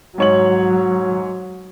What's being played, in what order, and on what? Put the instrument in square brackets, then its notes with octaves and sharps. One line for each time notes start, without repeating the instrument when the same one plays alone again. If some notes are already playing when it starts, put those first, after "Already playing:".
[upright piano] G#2 C#5 F#7 [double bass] F#3